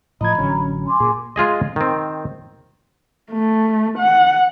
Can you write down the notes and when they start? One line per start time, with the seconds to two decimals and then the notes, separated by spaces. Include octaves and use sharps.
0.21 A2 F3 D#5 A#5 B5 G#6
0.39 A1 D3 F#3 C#4
0.87 G#5 C6 D6
1.00 A#2 G#4
1.36 G#3 F4 G#4 D#5
1.76 D#3 C4
3.33 A3
3.98 F#5